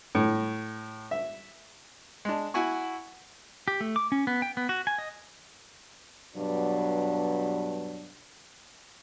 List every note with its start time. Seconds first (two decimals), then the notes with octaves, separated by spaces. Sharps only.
0.15 A2
1.11 E5
2.25 G#3 D4
2.54 E4 F#4 G#5 C#6
3.68 G4
3.81 A3
3.96 D6
4.12 C#4
4.27 B3
4.42 G5
4.57 B3
4.69 F#4
4.87 G#5
4.98 D#5
6.36 G2 B2 F#3 D4